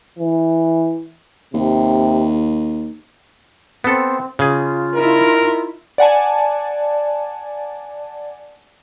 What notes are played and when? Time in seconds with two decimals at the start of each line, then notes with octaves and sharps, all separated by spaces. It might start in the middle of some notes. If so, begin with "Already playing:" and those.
0.19 E3
1.54 D#2 C3
3.84 B3 C4 A4
4.39 C#3 F4 G#4
4.94 D#4 E4 A#4
5.98 D5 F#5 G#5 A5